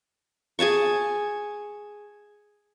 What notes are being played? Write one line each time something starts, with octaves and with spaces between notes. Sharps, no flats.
G#4 G#5 A5 C#6